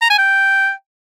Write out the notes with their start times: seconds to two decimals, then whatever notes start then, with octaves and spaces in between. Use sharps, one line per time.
0.02 A#5
0.10 G#5
0.18 G5